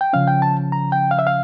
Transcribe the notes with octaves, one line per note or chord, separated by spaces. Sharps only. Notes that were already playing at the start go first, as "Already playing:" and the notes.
G5
C#3 F3 C#4 F5
G5
A5
A#5
G5
F5
E5
F5